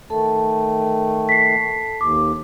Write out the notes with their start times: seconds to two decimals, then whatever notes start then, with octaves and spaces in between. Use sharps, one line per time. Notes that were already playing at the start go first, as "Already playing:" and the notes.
0.10 D#3 A3 A4 A5
1.29 B6 C7
2.01 D#2 D6